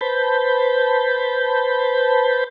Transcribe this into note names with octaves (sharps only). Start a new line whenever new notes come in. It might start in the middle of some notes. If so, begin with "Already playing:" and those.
B4 C5 A5 B5 G6